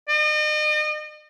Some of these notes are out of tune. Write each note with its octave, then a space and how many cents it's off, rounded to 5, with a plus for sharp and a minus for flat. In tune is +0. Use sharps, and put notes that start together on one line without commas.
D#5 -40